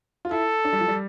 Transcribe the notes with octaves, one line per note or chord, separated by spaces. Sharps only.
F4
E4 A4
D4
G3
F3
G3